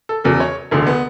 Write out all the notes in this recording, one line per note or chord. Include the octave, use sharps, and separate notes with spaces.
A4
E1 E2 C#3 F#3 A4
C#5
E1 D2 D3
B3